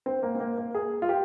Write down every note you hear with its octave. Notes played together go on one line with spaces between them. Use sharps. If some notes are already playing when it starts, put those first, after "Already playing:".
C4
A#3
C4
A#3
A#3
G#4
F4
G4